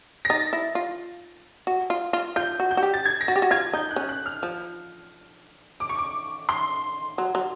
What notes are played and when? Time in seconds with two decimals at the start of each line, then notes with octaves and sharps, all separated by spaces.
0.25 A#6
0.30 D#4 A6
0.53 E4
0.75 F4
1.67 F#4
1.90 F4
2.13 F4
2.36 F4 G6
2.60 F#4
2.71 G6
2.77 F#4
2.83 G4
2.94 A6
3.05 G#6
3.21 A#6
3.28 F#4 A6
3.36 G4
3.42 F#4
3.51 F4 G#6
3.73 D#4 G6
3.91 F#6
3.96 C#4
4.09 F#6
4.26 F6
4.43 F3
5.80 D6
5.89 C#6
5.98 D6
6.49 C6
7.18 F#3
7.35 F#3